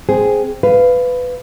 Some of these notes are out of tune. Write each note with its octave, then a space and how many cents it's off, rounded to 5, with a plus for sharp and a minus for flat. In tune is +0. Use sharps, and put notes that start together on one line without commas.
C4 +0 G#4 +0
B4 +15 F5 -10